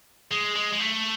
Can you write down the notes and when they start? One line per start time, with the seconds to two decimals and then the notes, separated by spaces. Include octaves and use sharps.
0.31 G#3
0.55 G#3
0.73 G#3
0.80 A3